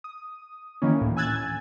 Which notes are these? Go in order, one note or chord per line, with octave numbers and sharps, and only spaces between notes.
D#6
D#3 E3 A#3 C#4
D2 A2
G#5 E6 F#6 G#6 A6